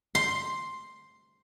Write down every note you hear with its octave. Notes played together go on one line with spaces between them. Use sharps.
C6